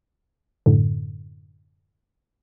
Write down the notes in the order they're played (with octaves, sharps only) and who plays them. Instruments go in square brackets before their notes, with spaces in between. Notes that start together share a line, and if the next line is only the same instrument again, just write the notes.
[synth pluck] F#2 A2 D3